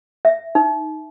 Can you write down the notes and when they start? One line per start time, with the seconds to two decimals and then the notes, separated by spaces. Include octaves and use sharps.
0.25 E5
0.55 D#4